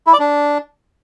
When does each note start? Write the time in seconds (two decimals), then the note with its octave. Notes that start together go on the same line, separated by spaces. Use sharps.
0.07 E4
0.13 D5
0.19 D4